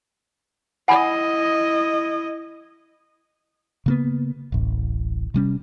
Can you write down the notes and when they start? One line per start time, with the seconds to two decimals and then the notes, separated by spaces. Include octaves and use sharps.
0.88 E4 D#5 F#5 G#5 B5
3.86 C#3 A#3 B3
4.52 D1 A1
5.34 C3 G3 C#4